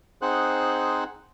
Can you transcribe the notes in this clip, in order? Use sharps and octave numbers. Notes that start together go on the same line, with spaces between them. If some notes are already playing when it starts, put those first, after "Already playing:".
C4 D#4 G#4 C5 F#5 F#6